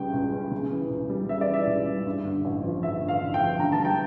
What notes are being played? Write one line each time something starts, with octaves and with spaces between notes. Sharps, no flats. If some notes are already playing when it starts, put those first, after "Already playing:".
Already playing: C#2 C#3 G3 C#4 G5
C#2
C#4
C#3
E3
C#2
G3
C#3 E5
D5
E3
E5
C#2
G3
G2
D3
A1
F3
G2 E5
D3
F5
A1
G5
F3
D3 A#5
A5
G3
G5